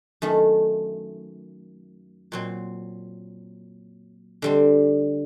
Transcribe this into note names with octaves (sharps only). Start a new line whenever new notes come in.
F#2 D#3 A3
A#2 F#3 C4
D3 G3 C4